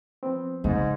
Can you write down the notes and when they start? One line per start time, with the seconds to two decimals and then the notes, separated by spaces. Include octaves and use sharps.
0.23 F3 B3 C4
0.64 G#2 C#3